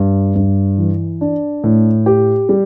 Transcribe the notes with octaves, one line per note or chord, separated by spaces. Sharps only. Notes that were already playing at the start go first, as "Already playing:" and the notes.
Already playing: G2
G2
E3
D4
A2
G4
G3